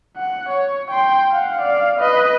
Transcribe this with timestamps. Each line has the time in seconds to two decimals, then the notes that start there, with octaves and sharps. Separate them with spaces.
0.17 F#5
0.49 C#5
0.91 G5 C6
1.32 F5 F#5
1.62 D5 F5
2.00 B4 D#5